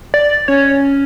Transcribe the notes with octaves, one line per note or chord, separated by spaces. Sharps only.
D5
C#4 C#5